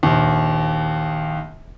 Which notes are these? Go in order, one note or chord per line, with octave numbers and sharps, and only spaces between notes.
A#1 D#2